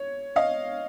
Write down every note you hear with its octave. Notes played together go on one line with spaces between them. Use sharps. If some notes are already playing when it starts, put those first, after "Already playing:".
Already playing: C#5
D#5 F5